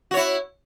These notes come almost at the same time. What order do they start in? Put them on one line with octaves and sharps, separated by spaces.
F#4 C#5 E4